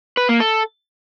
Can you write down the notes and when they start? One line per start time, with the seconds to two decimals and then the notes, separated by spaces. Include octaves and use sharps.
0.17 B4
0.29 A#3
0.40 A4